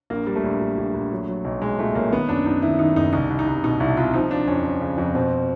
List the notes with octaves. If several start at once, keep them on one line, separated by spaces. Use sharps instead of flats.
A#1 A#3
G3
A3
A#1
A#1
A#1
A#1
F#3
F#3
B1
B1 G#3
A#2 A3
B1 A#3
D#3 B3
F#2 D4
F#2 D#4
D#3 E4
D#3 D#4
F#1 D#4
C2 D#4
C2
D#4
C2
B2 D#4
C2 E4
C2 F4
F3 D#4
F3 D4
F2 C#4
F3
C#3
F2
B2 C4